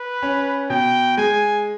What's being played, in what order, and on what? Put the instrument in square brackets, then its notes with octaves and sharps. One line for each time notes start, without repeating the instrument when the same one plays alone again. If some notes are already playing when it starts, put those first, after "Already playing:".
Already playing: [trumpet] B4
[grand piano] C#4
[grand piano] B2 [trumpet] G5
[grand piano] G#3 [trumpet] G#5